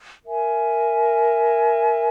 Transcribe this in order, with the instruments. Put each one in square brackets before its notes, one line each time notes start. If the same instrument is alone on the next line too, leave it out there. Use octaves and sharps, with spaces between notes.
[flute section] A#4 E5 G#5